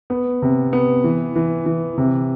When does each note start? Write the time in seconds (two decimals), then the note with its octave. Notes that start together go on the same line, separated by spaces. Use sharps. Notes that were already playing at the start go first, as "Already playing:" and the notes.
0.10 B3
0.42 C3
0.73 B3
1.04 E3
1.36 E3
1.66 E3
1.98 C3